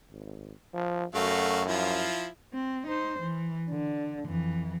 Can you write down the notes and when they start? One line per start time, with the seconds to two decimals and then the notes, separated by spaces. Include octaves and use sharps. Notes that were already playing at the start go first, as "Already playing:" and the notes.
0.11 G#1
0.73 F3
1.15 F#2 A3 F#4 F5
1.67 F3 E4 F4
2.53 C4
2.87 D#4 C5
3.19 E3
3.70 D3
4.27 F2 E3